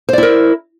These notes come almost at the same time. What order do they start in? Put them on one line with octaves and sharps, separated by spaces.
C5 D5 E4 A#4